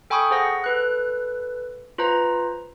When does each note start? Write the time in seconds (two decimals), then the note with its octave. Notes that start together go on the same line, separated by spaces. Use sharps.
0.10 A4 G5 G#5 B5 C#6 D#6
0.31 G#4 C5 F#5 A#6
0.64 A4 B4 F#6
1.98 F4 B4 C5 A#5